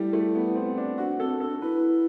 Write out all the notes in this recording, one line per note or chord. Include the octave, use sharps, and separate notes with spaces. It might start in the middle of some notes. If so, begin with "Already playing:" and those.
Already playing: G3 A3 E4
A3
B3
C4
D4
D4 F#4
C4 A4
D4 A4
E4 B4